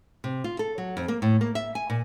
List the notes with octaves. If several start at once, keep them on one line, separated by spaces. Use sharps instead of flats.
C3
F4
A4
F#3
F2
A#3
A2
A#3
E5
G#5
A#2